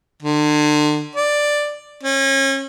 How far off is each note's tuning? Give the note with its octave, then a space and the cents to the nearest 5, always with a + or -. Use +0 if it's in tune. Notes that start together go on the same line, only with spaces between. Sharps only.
D3 +35
D5 +5
C#4 -35